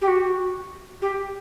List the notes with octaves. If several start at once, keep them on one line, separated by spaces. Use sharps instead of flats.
G4
F#4
G4